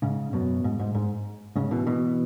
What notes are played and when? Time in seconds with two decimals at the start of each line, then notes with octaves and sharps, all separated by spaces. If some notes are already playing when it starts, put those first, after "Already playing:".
0.02 G#2 C#3
0.33 F#2 B2
0.64 G#2
0.80 G#2
0.95 G#2
1.56 G#2 C#3
1.71 B2 E3
1.87 B2 E3